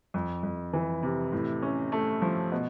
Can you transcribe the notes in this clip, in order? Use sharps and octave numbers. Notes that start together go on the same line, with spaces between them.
F2
F2
E3
C3
A2
C#4
A3
F3
B2